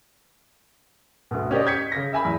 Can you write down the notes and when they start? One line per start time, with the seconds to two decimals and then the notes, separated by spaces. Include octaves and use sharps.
1.31 D2 B2
1.51 C#4 G4 C5 D5 D#5
1.66 G6 G#6 B6 C#7
1.92 C#3 A#6
2.13 E5 G#5 B5
2.25 E2